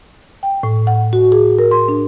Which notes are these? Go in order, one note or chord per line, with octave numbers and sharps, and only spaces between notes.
G5
A2
F#5
F#4
G#4
A#4
C6
D4